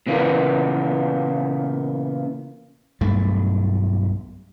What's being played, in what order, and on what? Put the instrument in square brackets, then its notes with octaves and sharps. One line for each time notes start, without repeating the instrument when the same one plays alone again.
[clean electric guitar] A#2 C#3 E3 A#3 B3
[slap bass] B1 G2 A3